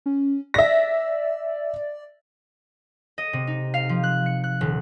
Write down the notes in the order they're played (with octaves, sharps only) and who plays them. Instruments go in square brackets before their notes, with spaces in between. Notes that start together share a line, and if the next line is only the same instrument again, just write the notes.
[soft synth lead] C#4
[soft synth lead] D5 [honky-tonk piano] E5 A#6
[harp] D#5
C3
D#4
F5
F3
F#6
C#7
F#6
D#1